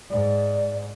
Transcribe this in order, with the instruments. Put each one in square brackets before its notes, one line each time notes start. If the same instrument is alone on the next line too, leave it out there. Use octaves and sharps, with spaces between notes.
[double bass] G#2 [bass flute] D5